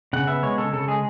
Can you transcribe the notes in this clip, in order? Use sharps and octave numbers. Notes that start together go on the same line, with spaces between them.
C#3 F#5
B3 E5
G#3 C#5
C#3 A4
C#3 A4
G#3 G#4